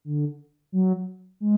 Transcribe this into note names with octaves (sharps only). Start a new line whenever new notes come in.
D3
F#3
G#3